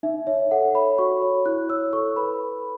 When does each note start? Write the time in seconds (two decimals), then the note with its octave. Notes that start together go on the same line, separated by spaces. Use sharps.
0.03 D#4 E5
0.27 C#5 E5
0.51 A4 F#5
0.75 C#5 B5
0.98 F#4 C#6
1.22 C#5
1.46 E4 F#6
1.69 C#5 E6
1.93 A4 C#6
2.16 B4 B5